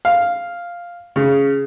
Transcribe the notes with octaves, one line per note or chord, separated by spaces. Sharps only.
F5
C#3